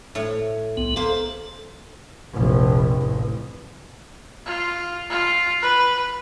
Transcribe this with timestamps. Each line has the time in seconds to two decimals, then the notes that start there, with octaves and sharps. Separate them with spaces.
0.15 A2 C#5
0.77 C2 B3
0.96 A#3 A4 C5
2.33 F1 A#1
2.98 A1
4.46 F4
5.10 F4
5.62 B4